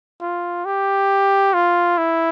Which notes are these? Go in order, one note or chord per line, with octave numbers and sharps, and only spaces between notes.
F4
G4
F4
E4